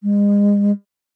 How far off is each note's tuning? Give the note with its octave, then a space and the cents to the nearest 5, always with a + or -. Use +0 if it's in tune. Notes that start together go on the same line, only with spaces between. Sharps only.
G#3 -35